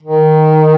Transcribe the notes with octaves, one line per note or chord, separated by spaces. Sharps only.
D#3